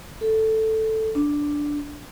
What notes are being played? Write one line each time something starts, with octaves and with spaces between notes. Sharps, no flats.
A4
D4